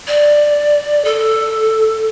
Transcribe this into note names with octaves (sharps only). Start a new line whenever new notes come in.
D5
A4